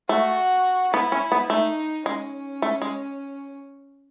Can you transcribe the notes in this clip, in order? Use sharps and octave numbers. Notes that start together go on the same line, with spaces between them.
A3 F#4
B3 E4
C#4
B3
A3 D#4
G#3 C#4
A3
G#3